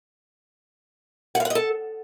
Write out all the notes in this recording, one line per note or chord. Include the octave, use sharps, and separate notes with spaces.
F#5
F5
F#5
D#5
A4